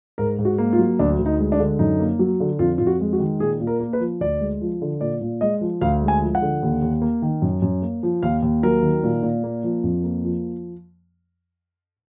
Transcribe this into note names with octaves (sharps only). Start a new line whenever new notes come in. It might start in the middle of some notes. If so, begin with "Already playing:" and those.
G#2 A#4
G#2
F#4
A#3
F4
F#3
D2 D4
D2
D#4
G#3
D4
D3
F#2 D#4
A#3
F#3
D3
F2 F4
F2 F4
F#4
G#3
F#4
D#3
A#2 G#4
A#2
A#4
A#3
B4
F3
D2 D5
G#3
F3
D3
A#2 D5
A#2
G#3 D#5
F3
D2 F5
G#3
G#5
F3
F#5
D3
D#2
D#2
A#3
D#3
F#2
F#2
A#3
F3
D#2 F5
D#2
F#3 A#4
D#3
A#2
A#2
A#3
F3
F2
A#3
F3